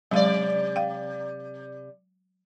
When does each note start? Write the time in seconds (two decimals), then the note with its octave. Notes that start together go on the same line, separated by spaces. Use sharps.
0.11 C3 F#3 G#3 D5 F5
0.76 F5 G5